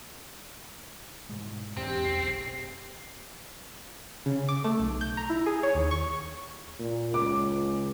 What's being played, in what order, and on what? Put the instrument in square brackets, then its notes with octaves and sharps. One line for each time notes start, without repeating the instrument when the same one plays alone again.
[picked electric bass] G#2 B2 G#3
[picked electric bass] E2 D4 [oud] G#2 C3 [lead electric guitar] C4
[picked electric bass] F#1 B1 [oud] C#3 [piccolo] C7
[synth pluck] C#3
D6
A3
B1
G6
A#5
E4
G#4
C#5
D#2
C#6
[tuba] A#2
[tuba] C#2 [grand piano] D6